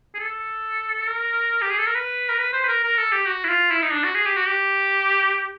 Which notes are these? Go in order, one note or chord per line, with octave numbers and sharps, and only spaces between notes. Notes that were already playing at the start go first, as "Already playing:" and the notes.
G#4
A4
A#4
G4
G#4
A4
A#4
B4
A#4
B4
C5
B4
A#4
A#4
A4
G4
F#4
E4
F4
E4
D#4
D4
F#4
G#4
G4
F#4
G4